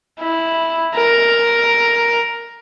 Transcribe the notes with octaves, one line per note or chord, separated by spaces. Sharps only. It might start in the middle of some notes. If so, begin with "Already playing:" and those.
E4
A#4